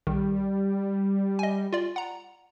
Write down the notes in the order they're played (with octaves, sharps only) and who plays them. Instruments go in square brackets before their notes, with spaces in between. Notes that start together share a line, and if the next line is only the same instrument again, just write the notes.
[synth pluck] B1 D#3 [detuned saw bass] G3
[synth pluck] D#5 G#5
F4 D5
F#5 A#5